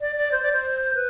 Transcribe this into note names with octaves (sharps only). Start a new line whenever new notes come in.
D5
D5
C5
D5
C5
B4